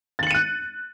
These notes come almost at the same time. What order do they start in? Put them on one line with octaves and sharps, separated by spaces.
A6 F#7 C#7 D#7 F#6